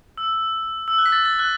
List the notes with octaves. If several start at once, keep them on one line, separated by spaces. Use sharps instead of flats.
E6
E6
F#6
B6
A6
A6
F#6